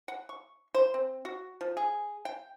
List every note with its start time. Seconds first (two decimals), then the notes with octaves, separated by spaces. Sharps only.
0.08 F#5
0.29 C#6
0.74 C5
0.94 C4
1.25 F#4
1.61 F3
1.77 G#4
2.25 G5